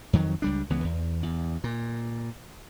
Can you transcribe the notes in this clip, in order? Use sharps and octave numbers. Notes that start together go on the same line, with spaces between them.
F2 D#3 F#3
C#2 G3 D4
C#2 E3 B3
E2
E2
A#2